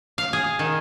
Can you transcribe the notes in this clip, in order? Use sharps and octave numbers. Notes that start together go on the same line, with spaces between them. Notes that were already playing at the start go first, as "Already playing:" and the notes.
F5
G#4
D#3